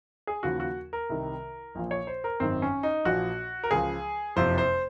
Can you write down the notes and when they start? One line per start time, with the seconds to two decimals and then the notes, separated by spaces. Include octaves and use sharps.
0.27 G#4
0.43 D#2 C#3 F3 F#4
0.60 F#4
0.93 A#4
1.10 C2 C3 D#3
1.75 A#1 A#2 F3
1.91 C#5
2.07 C5
2.24 A#4
2.40 G#1 F#2 D#3 C4
2.62 C#4
2.83 D#4
3.05 A#1 A#2 F3 F#4
3.64 A#4
3.71 C#2 C#3 F3 G#4
4.36 F#1 F2 C3 F3 C5
4.58 C5